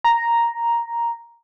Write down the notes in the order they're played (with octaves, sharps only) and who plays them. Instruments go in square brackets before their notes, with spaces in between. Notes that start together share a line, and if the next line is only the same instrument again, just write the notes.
[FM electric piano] A#5